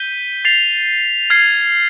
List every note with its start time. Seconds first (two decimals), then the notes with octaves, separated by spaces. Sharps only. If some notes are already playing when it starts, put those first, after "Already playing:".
Already playing: G6 B6 D#7 G7
0.45 A6 C7 F7
1.30 F6 G#6 C7 F7